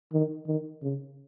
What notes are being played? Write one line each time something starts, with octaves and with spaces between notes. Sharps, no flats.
D#3
D#3
C#3